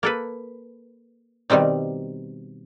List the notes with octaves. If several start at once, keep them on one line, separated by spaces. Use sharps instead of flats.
A#3 A4 B4
B2 D#3 G3 C4 D#4